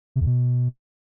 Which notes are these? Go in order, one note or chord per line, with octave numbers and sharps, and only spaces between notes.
C3
E2
B2